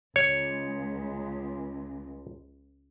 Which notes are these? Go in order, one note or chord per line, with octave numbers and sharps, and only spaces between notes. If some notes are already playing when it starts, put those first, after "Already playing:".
C#2 C#5